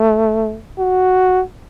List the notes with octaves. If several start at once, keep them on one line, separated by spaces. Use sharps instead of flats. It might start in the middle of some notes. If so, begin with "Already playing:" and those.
Already playing: A3
F#4